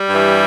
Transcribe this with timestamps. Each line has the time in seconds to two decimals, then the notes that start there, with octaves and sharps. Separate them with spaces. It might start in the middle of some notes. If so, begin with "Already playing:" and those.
Already playing: G3
0.09 G2 E3